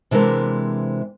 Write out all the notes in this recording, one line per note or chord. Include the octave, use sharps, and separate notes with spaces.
C3 E3 G#3 D4 A#4